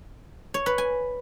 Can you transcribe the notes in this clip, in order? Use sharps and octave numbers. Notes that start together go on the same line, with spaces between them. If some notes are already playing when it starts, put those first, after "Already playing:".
C#5
B4
G#5